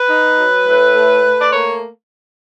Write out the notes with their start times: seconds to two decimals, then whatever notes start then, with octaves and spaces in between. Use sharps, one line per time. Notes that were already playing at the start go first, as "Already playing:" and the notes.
Already playing: B4
0.09 D#4
0.38 F#3
0.67 A2
0.95 A3
1.24 A3
1.41 D5
1.53 A#3 C#5